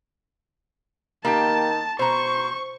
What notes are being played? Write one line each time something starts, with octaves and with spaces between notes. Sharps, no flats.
D#3 A#3 G4 G5 A5
B2 C5 A#5 C#6